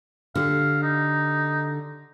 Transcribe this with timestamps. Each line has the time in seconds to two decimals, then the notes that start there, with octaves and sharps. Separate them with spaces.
0.35 D3 G4 F5
0.83 D#4